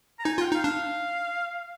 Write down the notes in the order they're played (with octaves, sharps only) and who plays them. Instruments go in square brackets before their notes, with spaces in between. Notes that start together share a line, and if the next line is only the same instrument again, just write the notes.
[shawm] A#5
[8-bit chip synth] D#4 [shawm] G#5
[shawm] G#5
[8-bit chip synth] F4 [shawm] F5
[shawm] G5
[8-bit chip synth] D#4 [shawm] F5
[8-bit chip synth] D4 [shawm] F5